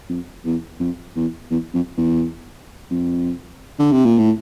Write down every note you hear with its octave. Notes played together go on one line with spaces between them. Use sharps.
F2
E2
F2
E2
E2
F2
E2
F2
D3
C3
A#2
A2